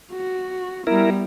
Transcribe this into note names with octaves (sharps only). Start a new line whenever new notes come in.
F#4
G3 B3 E4 A#4